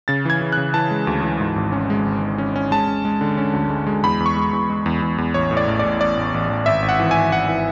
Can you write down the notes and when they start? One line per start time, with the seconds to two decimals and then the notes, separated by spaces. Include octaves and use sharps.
0.08 C#3 A6
0.25 E3 G#6
0.42 E3
0.52 C#3 F#6
0.74 E3 A5
0.91 G#3
1.07 D2
1.23 E3
1.40 G#2
1.56 G#1
1.72 C#4
1.90 G#3
2.06 G#1
2.23 G#3
2.38 C#4
2.56 C#4
2.71 G#3 A5
2.87 C#4
3.05 G#3
3.21 D3
3.37 C#4
3.53 D2
3.70 G#3
3.87 G#3
4.03 E2 B5
4.20 E2
4.26 C#6
4.37 G#3
4.53 E2
4.70 G#3
4.86 E2
5.02 E2
5.18 E2
5.34 A1 C#5
5.51 A2
5.57 D5
5.68 A1
5.79 D5
5.84 A1
6.01 A1 D5
6.17 A1
6.34 A1
6.50 A1
6.66 G#1 E5
6.82 G#1
6.89 F#5
7.00 E3
7.11 G#5
7.16 G#1
7.32 G#1 F#5
7.49 E3